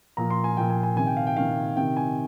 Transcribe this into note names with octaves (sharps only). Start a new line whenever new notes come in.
A#2 F3 A#5
C6
G#5
A#2 F3 G5
G#5
G#5
C3 D#3 G#5
G5
F5
G5
C3 D#3 F5
C3 D#3 G5
G#5